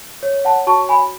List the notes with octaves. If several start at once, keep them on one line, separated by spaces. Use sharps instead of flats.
C#5
F#5 A5
F#4 A5 C#6
G#5 B5